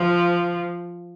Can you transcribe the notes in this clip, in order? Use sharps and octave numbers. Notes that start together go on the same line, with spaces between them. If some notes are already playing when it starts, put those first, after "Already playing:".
Already playing: F3